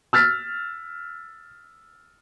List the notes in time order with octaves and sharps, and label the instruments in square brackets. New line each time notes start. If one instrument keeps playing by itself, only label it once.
[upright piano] E6 F6 A6 B6